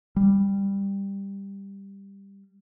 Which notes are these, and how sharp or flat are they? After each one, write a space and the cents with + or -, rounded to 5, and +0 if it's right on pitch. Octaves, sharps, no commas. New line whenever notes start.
G3 +10